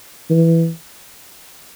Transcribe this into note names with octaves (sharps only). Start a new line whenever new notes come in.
E3